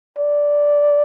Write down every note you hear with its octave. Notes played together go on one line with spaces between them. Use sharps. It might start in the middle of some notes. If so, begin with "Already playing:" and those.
D5